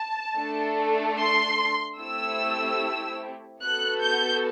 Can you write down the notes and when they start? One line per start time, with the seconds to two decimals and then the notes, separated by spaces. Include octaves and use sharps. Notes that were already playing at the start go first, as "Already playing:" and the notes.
Already playing: A5
0.37 A3 D4 A4
1.19 C6
1.99 A3 C4 E4 G4 E6
3.62 B3 F#4 A4 F#6
4.03 G6